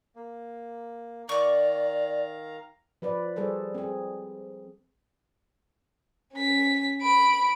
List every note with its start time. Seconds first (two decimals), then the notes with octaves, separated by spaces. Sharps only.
0.16 A#3
1.29 D#3 D5 F5 A#5 C#6 D6
3.02 F3 B4 D5
3.36 G3 G#4 A4 C5
3.74 C4 G#4
6.34 C#4 B6
7.02 B5 D7